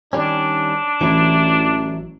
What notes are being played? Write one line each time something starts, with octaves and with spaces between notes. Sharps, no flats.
D#3 G3 C#4 D4
A1 E3 F#3 E4